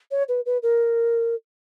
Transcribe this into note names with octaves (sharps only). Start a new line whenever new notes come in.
C#5
B4
B4
A#4